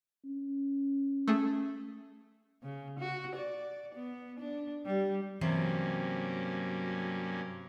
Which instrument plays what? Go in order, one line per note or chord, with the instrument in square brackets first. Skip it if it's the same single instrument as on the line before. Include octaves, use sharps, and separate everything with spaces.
[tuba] C#4
[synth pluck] A3 G#4
[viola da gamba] C#3
F#4
D5
B3
D4
G3
[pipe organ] G2 A#3 C#4 [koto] C3 [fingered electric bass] E3 [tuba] F#3